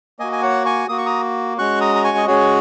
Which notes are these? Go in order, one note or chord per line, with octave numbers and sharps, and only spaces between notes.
A#3 F#4 D#5 G#5
G#5
C#5 F#5
G#5 C#6
A#3 F#4 D#6
C#6
A#5 D#6
G#3 C#4 F#4 C#6 F#6
A#5 D#6
A#5
G#5 C#6
D#5
G#3 C#4 F#4 G#4 C#5